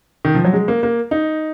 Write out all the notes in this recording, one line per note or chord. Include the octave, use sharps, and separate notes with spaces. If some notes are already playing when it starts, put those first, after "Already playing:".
D#3
F3
F#3
G#3
A#3
A#3
D#4